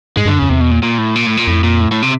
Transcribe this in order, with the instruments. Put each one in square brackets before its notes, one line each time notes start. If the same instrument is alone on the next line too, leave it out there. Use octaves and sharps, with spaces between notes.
[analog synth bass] G#2 [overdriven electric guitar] G#3
[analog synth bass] G2 [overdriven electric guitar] D3
[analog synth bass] F#2
[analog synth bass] F2 [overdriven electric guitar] C#3
[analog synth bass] E2 [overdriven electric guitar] C3
[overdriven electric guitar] B2
A#2
A#2
A2
A#2
A2
A#2
[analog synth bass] F2 [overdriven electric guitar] A2
[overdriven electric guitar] A#2
A2
A2
C3